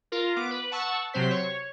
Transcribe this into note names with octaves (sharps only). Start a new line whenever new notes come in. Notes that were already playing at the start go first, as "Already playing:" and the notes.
F4 A#4
B3 D6
B4
F#5 A5 C#6 E6
C3 F#3 C4 C5 B6
C#5